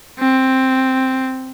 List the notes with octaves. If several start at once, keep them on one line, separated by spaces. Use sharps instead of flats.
C4